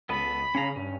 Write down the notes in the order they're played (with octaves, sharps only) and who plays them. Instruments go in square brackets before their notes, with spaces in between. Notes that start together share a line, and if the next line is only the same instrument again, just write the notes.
[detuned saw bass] C#2 [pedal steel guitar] B3 A4 D#5 [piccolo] B5
[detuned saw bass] C#3 [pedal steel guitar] C#4 F5 A#5
[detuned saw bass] G2 [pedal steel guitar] C#4